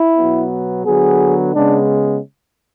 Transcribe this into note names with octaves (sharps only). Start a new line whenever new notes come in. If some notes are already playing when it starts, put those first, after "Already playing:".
Already playing: E4
B2 F#3 B3
D3 F#3 B3 G#4
C#3 G#3 B3 D4